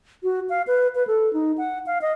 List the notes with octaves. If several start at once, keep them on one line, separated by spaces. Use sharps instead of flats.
F#4
F5
B4
B4
A4
D#4
F#5
F5
D#5